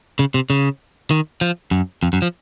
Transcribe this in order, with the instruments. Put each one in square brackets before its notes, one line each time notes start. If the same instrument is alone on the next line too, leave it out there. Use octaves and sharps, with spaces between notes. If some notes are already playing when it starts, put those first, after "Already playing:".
[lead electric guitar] C#3
C3
C#3
D#3
F3
F#2
F2
F#2
F3